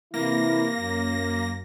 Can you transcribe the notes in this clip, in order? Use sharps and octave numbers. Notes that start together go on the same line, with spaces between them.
C3 E3 A#3 E4 A#6
F#2